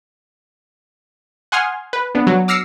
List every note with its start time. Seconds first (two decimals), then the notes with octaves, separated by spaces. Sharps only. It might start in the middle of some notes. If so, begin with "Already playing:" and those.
1.52 F#5 G#5 C6 D#6 F6 G#6
1.93 B4
2.15 B3 D4
2.27 F#3
2.48 D6 E6 F6 A#6 C7 C#7